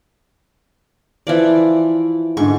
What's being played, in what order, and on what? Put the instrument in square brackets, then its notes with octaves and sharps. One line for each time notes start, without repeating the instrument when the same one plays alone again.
[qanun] E3 F3 D5
[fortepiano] G#2 D3 [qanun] C#6